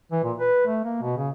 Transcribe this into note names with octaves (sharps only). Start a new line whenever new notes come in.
E3
A#2
B4
A3
A#3
B2
C#3